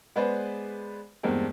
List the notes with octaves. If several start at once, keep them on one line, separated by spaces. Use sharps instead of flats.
G#3 B3 G#4 B4 C5 D5
E2 G2 G#3 A#3 C4